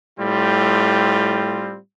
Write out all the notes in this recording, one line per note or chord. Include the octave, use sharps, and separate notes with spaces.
A2 G3 C4 F4